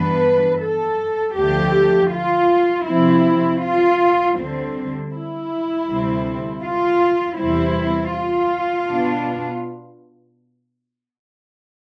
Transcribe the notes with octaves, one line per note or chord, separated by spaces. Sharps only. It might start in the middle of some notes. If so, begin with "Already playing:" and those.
Already playing: G2 E3 B3 D4 B4
A4
D2 D3 F3 A3 G4
F4
C3 F3 C4 E4
F4
D2 D3 G3 C4
E4
D2 C3 G3 C4
F4
E2 C3 G3 C4 E4
F4
B2 B3 D4